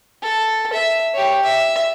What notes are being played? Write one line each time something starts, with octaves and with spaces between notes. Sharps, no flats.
A4
E5
G4 C#5
E5